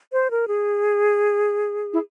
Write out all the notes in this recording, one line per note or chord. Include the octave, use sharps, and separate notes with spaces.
C5
A#4
G#4
E4